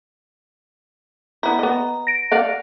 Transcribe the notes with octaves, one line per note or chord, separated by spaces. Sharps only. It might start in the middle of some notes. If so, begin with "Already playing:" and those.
B3 E4 A#5
B3 D#5
A#6 D7
D5 F5 F#5